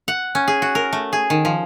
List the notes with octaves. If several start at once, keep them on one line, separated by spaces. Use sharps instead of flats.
F#5
C#4
G#4
F#4
A#4
A3
G#4
D#3
F3